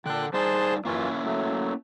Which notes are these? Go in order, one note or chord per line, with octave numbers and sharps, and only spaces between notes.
A#2 D3 A4 G5 F#6
G3 D#4 G#4 C5 D5 A5
F#2 E3 A#3 C#4 E4 F4
F#3 A3